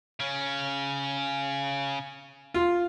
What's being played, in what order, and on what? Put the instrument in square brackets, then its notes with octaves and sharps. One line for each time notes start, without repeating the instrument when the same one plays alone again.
[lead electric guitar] C#3 C#4
[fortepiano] F4